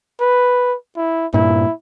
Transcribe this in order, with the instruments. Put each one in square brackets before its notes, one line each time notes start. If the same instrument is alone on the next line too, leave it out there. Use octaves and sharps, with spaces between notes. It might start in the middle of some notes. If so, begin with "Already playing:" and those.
[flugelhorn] B4
E4
[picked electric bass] G2 A#2 [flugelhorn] E4